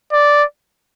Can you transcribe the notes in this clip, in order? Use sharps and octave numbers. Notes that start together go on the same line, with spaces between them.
D5